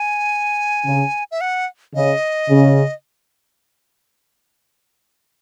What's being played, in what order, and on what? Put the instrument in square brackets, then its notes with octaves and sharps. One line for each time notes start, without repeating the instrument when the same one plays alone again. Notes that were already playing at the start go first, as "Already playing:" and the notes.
Already playing: [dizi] G#5
[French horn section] C#3
[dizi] E5
F#5
[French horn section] C#3 [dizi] D#5
[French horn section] C#3